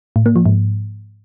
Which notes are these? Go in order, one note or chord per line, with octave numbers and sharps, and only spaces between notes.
A2
A#3
F3
G#2